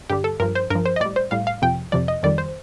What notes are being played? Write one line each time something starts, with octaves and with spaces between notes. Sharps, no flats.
G2 D3 G3 G4
A4
G2 F3 A#4
C5
G2 F3 A#4
C5
D#5
A2 G3 D5
C5
A2 G3 F5
F5
F2 C3 F3 G5
F2 C3 F3 D5
D#5
F2 D#3 G3 D5
C5